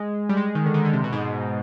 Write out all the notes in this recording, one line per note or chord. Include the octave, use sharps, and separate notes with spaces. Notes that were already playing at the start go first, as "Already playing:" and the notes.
Already playing: G#3
G3
G#3
D#3
D3
D#3
D3
C3
B2
G#2